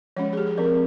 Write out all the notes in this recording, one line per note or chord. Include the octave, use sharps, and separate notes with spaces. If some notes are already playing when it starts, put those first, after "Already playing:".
F3 G#3 C#4 C#5
G#4
G4
G#4
F3 C4 A#4